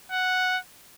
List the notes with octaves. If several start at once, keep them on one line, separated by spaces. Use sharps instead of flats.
F#5